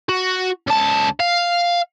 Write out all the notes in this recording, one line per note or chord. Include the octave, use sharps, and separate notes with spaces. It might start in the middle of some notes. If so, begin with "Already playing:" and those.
F#4
C#2 A5
F5